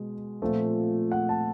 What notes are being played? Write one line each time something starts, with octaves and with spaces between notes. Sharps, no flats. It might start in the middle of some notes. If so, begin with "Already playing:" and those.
Already playing: B2 G#3
A#2 F3 A3 C4
F#5
A5